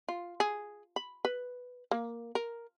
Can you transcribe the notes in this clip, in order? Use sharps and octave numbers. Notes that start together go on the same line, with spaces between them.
F4
G#4
B5
B4
A#3
A#4